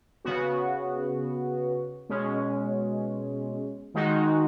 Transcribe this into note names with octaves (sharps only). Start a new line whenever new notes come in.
C#3 B3 F#4
B2 G#3 C#4
D#3 G#3 D#4 F#4